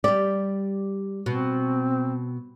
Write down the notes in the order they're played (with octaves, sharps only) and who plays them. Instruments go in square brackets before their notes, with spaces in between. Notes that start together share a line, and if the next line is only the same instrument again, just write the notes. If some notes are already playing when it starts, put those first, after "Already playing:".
[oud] G3 G4 [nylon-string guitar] D5
[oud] B2 [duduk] C4